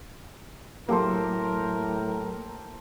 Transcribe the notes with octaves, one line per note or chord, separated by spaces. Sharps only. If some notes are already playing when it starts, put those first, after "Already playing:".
A2 F#3 A#3 G4 A4 A#4 C5